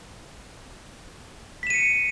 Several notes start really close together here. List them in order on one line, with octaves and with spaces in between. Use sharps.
B6 E7 D#7 C#7